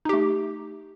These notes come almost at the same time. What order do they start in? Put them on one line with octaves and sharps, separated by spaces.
D#4 G4 A3